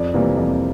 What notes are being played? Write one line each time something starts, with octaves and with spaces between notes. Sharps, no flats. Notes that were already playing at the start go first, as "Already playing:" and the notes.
Already playing: F2 D5
C3 E3 G3 A#3
F2